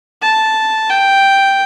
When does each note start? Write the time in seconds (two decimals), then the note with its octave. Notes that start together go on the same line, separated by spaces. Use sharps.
0.22 A5
0.90 G5